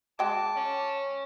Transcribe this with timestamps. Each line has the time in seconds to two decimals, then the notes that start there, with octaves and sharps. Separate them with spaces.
0.19 G#3 F#4 G5 A5 D6
0.56 C#4